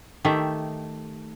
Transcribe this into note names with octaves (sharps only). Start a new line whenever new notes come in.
D#3 A3 G4 E5